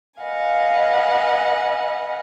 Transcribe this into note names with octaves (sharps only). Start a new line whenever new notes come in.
B4 D#5 F5 F#5 G#5